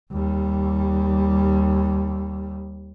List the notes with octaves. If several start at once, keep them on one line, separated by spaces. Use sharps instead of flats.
D#2 G3